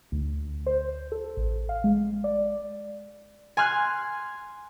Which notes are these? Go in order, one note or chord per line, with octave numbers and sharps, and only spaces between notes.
D2
C5
A4
A1
F5
G#3
D5
G#5 C6 F6 F#6